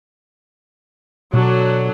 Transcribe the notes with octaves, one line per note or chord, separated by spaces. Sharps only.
B2 D3 F#3 D4